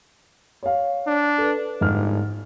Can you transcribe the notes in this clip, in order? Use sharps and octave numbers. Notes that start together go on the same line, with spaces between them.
C#5 F5
D4
A4 B4
G1 G#2 F6